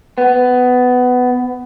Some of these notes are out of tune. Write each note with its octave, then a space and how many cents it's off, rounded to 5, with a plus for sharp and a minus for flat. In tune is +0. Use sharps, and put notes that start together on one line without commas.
B3 +15